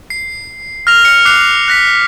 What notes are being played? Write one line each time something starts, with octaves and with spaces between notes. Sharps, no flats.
C7
F6 A#6 F7
F6 C#7
D6 F#6 C7 F7
F#6 A#6 B6